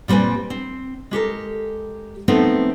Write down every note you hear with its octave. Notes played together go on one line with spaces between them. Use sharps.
A#2 G3 C4 B4 G#5
C4
G#3 G4 A4 A#4
F3 A3 B3 C4 D#4